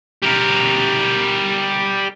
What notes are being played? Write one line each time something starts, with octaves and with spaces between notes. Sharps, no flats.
G3 A#4